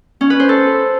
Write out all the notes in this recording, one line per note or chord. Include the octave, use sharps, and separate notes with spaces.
C#4
B4
C5
A4